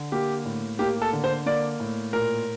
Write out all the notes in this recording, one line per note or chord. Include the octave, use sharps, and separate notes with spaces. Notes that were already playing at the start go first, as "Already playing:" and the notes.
Already playing: D3
A#3 G4
A2
A#3 G4
A4
D3
C5
A#3 D5
A2
A#2 A#4